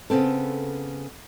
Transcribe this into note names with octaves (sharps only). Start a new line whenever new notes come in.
C#3 B3 C4 A4